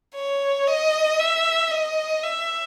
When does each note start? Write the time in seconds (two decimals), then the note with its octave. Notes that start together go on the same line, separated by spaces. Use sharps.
0.15 C#5
0.67 D#5
1.19 E5
1.71 D#5
2.23 E5